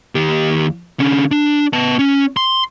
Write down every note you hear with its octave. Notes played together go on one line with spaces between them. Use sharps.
D#2 G4
D3 C#4
D4
B3 A5
C#4
C6